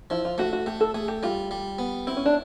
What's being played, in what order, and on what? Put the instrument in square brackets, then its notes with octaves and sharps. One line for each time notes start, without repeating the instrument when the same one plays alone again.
[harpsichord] F3 [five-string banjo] E4
[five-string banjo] F4
[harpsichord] A3 [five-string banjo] F#4
[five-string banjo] F#4
[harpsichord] A3 [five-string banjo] G4
[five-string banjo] A4
[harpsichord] A3 [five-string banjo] G#4
[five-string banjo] G4
[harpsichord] G3 [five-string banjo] F4
[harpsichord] G3
B3
[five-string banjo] C4 [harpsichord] E4
[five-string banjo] C#4
D4